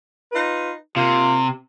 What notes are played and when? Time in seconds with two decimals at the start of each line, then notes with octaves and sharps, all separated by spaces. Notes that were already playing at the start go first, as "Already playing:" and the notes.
0.32 D#4 F4 B4
0.96 C3 A#3 F4